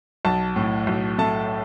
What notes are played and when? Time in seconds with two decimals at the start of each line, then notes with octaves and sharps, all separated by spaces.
0.25 B1 A5
0.56 A2
0.87 B1
1.18 A3 A5